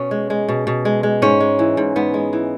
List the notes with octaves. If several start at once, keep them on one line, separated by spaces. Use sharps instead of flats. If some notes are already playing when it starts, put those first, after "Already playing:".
Already playing: B2 C#4
G#3
G#3
B2
B2
G#3
G#3
G#2 C#4
G#3
E3
G#2
G#2 B3
G#3
E3